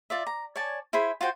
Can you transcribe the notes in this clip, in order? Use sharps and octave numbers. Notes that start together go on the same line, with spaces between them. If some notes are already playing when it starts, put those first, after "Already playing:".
F4 D5 E5
A#5
C#5 D5 G#5 A5
E4 G#4 C5 B5
F4 F#4 C5 G5